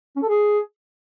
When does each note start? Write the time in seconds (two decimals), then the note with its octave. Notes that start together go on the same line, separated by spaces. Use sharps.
0.16 C#4
0.22 A4
0.29 G#4